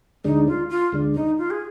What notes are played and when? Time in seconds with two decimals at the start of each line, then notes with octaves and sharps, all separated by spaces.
0.24 D2 D3 G#3 D4 D#4
0.47 F4
0.70 F4
0.92 D2 D3 G#3 D4
1.15 D#4
1.38 F4
1.50 G#4